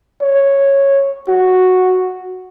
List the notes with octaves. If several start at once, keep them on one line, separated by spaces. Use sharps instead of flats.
C#5
F#4